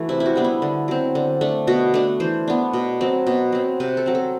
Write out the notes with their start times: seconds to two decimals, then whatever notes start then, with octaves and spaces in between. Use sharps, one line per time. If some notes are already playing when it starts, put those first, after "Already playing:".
Already playing: E3 A3 F#4
0.09 C3 E4
0.20 E4
0.26 F#4
0.36 G3 B3 D4
0.44 E4
0.62 D3
0.88 F#3 C4
1.15 D3
1.41 A3 D4
1.67 B2 F#4
1.94 A3 D4
2.20 E3 C5
2.48 B3 D4
2.73 B2
3.01 F#3 C4
3.27 B2
3.52 F#3 C4
3.80 C3 B4
3.97 A4
4.06 F#3 C4
4.15 A4